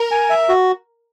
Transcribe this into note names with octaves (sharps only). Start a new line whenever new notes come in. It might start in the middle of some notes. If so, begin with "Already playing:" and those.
Already playing: A#4
G#5
E5
F#4